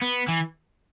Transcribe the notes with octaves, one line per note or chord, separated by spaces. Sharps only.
B3
E3